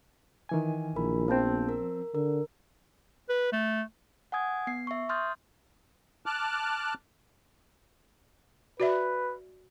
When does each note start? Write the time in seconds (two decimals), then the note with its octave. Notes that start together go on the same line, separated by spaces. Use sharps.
0.49 D#3 E3 G#5
0.96 A#1 E4 A#4 B5
1.28 F3 B3 C4 A5 G6
1.69 A#4
2.15 D3 A#4
3.29 B4
3.53 A3
4.32 F#5 G#5 D#6 G#6
4.67 B3 C7
4.87 E5 C#6
5.09 C6 D#6 F6 G6 A6
6.26 A5 D6 F6 F#6
8.80 F#4 B4 D5 E5